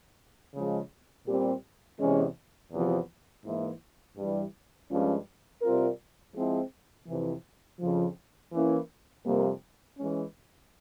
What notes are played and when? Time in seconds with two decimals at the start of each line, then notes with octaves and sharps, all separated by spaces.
0.55 C#3 F3 G#3
1.27 A#2 G3 C4 G4
2.00 E2 C3 E3 G#3 C#4
2.72 E2 C3 F3
3.45 G#2 E3 A#3 E4
4.17 G2 E3 G3
4.90 G2 F3 G#3 C#4 F4
5.62 C3 G3 C4 F4 A#4
6.36 F3 G#3 C4 E4 G#4
7.08 F2 C3 E3
7.81 F2 C#3 F3
8.52 E3 A#3 C#4 E4
9.25 F2 C3 G3 A#3
9.98 E3 G#3 C#4